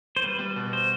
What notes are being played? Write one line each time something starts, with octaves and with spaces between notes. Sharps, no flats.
C5
G3 B4
G3
B2
C5